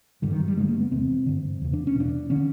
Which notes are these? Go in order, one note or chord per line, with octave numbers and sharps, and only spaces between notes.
G2 D3 G3
D#3
F#3
G3
G2 D3 G#3
A#3
B3
E2 C3 C4
G2 D3
E2 C#3
D4
C#4
E2 B2 D4
D3 C#4